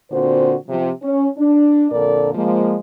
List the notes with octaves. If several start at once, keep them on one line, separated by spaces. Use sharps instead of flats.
A#2 D3 C4 F#4 C5
C3 F3
C#4
D4
F2 A#2 D3 A4 A#4 D5
F3 G#3 A#3